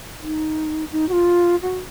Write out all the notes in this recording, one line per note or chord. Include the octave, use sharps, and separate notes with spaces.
D#4
D#4
F#4
F4
F#4